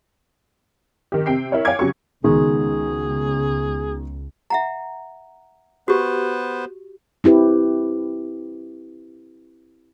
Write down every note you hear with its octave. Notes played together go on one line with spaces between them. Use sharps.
D#3 G4
C3 G5 C7
E4 A#4 C#5
C#5 F5 G5 G#5 D6 G#6
C#3 F#3 G4 C#6
C#2 B2 D#3 G#3 G#4
E5 F#5 A#5
B3 F#4 G4 B4 C5
C4 E4 G4 B4